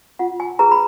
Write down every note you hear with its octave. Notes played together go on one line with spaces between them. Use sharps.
F4 F#5
G#5
G#4 B4 A#5
B5